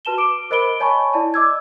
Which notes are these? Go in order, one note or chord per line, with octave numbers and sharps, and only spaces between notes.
F#4 B4 A5 E7 G7
D6 D7
A#4 C5 D#5 B5 D7 G7
C#5 D#5 G#5 A5 B5 C#6
E4 D5 A5
D#5 D6 E6 G#6